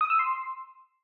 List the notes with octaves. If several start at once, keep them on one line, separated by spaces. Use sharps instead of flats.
D#6
E6
C6